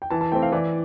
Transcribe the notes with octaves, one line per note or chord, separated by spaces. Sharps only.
G5
E3 A5
A5
A3 C4 G5
F5
E3 D5